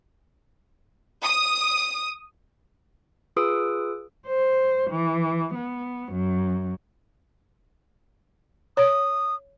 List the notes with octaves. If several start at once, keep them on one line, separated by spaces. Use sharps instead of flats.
D#6
F4 G#4 B4 D#6 E6 D7
C5
E3
B3
F#2
C#5 D#6